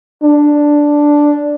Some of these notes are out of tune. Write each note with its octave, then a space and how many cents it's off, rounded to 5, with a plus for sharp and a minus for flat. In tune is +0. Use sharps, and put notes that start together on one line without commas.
D4 +0